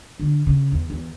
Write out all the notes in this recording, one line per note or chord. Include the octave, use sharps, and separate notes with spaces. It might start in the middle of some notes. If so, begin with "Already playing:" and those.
D3
C#3
E2
E2